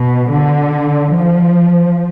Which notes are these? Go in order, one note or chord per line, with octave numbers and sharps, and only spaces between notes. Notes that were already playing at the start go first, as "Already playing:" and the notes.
Already playing: B2
D3
F3